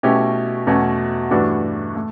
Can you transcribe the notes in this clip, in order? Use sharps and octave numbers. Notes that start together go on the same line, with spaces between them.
B2 A3 C#4 E4 G4
E2 B2 A3 C#4
G2 E3 A3 D4 F#4
A3